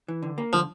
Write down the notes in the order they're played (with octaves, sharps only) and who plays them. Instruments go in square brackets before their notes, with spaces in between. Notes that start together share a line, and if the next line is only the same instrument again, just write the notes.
[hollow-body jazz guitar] E3
D3
A#3
[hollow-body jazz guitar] D3 [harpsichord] F3